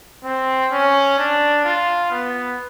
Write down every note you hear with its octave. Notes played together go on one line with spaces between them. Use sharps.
C4
C#4
D4
F4
B3